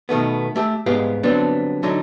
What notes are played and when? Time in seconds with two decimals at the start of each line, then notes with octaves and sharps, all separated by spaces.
0.09 B2 D#3 A3 B3
0.56 A3 G4 E5
0.86 C2 G#2 G#3 B3 G4 F5
1.23 D3 F#3 G3 B3 C4 D4
1.83 D3 F#3 D#4